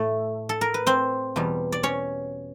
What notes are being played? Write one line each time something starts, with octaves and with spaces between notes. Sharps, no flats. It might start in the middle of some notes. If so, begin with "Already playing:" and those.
Already playing: A2 A3 A4
A4
A#4
B4
C4 C5
E2 B2 G3
D5
C#4 C#5